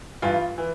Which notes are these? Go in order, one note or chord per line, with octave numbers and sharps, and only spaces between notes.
G2 E3 F4
E3